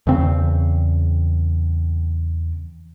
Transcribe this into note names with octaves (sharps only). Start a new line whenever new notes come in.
E2 C#3 C4